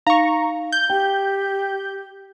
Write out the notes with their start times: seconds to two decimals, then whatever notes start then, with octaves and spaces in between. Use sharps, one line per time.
0.07 D#4 F5 A#5 C#6
0.72 G6
0.90 G4 G5